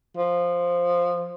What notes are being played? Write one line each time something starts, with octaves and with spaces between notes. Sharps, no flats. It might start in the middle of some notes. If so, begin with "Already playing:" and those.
F3